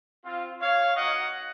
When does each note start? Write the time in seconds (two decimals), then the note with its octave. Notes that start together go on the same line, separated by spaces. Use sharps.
0.24 C4 F4
0.61 C#5 F5
0.96 A#3 D#4 F#4 D#5 F#5